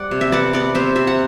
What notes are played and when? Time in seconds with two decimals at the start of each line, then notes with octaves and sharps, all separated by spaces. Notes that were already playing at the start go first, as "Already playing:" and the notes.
Already playing: G3 D5 F#5
0.11 C3
0.21 E5
0.32 B3 D5 F#5
0.53 B3 D5 F#5
0.75 C3 C5 E5
0.95 C3 E5
1.07 F#5